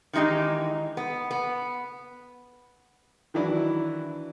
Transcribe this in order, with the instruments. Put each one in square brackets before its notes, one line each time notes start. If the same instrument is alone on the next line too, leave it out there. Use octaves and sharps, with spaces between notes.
[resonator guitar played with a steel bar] D#3 E3 G#3 D#4 G4
B3
B3
[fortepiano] D#3 E3 F#3 D4 E4